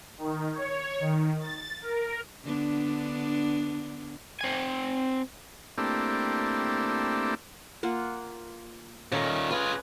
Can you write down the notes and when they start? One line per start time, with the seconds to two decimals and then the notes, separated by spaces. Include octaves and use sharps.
0.18 D#3
0.55 C#5
1.00 D#3
1.40 A6
1.82 A#4
2.43 D3 B3 D4
4.41 C4 G#5
5.78 A3 A#3 C4 D4 E4 G4
7.83 A#3 F4 F#5
9.12 A#2 D#3 C#4 A4 D5
9.51 F4 G#4 B4